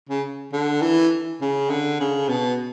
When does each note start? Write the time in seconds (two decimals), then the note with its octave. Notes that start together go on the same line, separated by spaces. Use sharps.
0.09 C#3
0.53 D3
0.82 E3
1.41 C#3
1.70 D3
2.00 C#3
2.29 B2